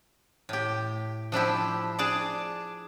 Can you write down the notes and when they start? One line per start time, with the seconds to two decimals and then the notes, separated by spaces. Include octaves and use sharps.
0.49 A2 G4
1.32 F3 D4 E4 G4
1.98 D4 G#4 D5 A5